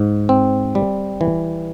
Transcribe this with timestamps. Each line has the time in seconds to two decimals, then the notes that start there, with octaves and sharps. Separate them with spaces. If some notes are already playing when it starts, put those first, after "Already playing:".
Already playing: G#2
0.29 C4
0.75 G3
1.21 E3